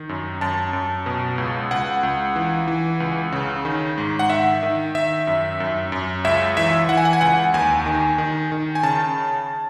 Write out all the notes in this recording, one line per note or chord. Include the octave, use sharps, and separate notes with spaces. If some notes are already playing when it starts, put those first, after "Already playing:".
Already playing: D#3
F#2
F#2 A5
F#2
B2
C#2
C#2 F#5
C#2
E3
E3
C#2
C#3
D#3
G#2
F#5
D#3 E5
D#3
D#3 E5
F#2
F#2
F#2
C#2 E5
E3 E5
E3 F#5
G#5
F#5
G#5
C#2 F#5
D#2 G#5
D#3
D#3
D#3
G#5
C#3 A5